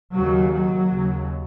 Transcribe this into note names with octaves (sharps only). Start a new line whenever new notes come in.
D#2 C#3 F#3
F#3
D#2 C#3